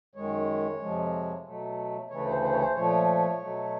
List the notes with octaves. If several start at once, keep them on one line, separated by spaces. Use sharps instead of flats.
F#2 D#3 G#3 C#5
F2 C3 F3 G#3
B2 F#3 A3
D2 C#3 E3 A3 C#5
C5
C5
C#5
C5
A#2 F3 A3 C#5
B2 F#3 A3